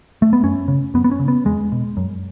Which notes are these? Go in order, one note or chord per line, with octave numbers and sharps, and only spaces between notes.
A3
B3
F#2 C#4
C#3
F#2 B3
B3
C#4
C#3
B3
E2 G#3
B2
F#2